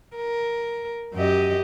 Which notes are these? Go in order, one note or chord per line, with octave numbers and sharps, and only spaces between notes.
A#4
F#2 G4 D#5